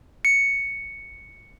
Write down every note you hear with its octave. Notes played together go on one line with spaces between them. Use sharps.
C#7